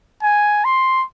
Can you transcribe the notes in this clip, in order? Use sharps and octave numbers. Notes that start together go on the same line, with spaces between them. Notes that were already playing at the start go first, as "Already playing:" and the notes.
G#5
C6